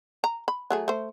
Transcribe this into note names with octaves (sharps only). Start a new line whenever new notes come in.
A#5
B5
F#3 A3 G#4
A3 C5